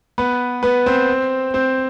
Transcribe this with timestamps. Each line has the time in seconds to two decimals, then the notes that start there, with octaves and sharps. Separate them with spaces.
0.18 B3 B4
0.63 B3 B4
0.86 C4 C5
1.54 C4 C5